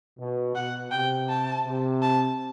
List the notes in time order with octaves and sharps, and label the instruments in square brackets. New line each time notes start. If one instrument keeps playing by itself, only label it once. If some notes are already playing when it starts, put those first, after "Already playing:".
[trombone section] B2
[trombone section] B2 [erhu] F#5
[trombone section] C3 [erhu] G5
[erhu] A5
[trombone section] C3
[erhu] A5